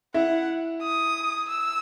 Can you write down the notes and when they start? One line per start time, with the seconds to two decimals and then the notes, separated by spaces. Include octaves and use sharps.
0.14 E4 F#5
0.82 D#6
1.49 E6